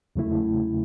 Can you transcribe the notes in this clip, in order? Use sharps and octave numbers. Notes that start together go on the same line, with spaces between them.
E2 C#3 F#3 A3 E4